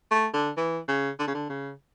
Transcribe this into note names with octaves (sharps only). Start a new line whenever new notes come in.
A3
D3
E3
C#3
D3
C#3
D3
C#3